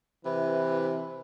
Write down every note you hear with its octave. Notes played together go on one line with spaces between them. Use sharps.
C3 E3 E4 B4